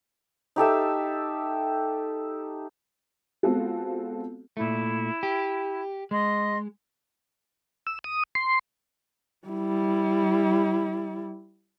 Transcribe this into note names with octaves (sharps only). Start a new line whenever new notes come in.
D#4 G4 A4 E5
G#3 B3 C4 F4 F#4 A4
A#2 A3 E4
G4
G#3 D#5 C6
E6
D#6
C6
G3 E4